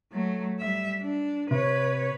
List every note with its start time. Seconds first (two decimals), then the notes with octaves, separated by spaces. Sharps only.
0.12 F#3 A3
0.60 G3 E5
1.02 D4
1.51 C3 B4 C#5